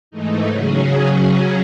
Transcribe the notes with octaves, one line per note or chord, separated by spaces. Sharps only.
G#2 E3 A3 D#4
C#3 F#3 C#4 G#4